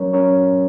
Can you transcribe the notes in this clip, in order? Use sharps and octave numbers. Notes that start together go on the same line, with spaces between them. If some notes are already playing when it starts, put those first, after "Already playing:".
Already playing: F#3 C#4 A#4 C#5
F#3 C#4 A#4 C#5